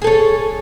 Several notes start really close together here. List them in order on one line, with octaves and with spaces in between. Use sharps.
G#4 A4 C#5